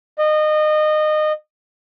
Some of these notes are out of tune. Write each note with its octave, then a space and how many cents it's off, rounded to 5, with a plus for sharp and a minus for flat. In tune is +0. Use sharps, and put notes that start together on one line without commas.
D#5 -25